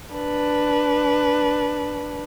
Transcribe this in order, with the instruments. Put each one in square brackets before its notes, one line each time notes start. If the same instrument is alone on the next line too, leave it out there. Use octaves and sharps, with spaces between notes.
[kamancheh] D4 B4